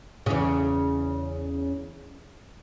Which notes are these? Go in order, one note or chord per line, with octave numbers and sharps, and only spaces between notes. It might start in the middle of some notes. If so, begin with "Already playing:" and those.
E2 C#3